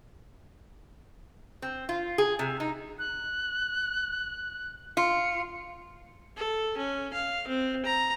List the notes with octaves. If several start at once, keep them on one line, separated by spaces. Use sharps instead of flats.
C4
F4
G#4
C3
D#4
F#6
F4 C#7
A4
C#4
F5
C4
A#5